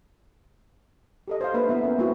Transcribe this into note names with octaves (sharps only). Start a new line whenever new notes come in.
G4 A4 D#5
C5 F5
A#3 D4 B4 E5
B3 E4 E5
C#4 A#4
A#3 C4 E4 F#4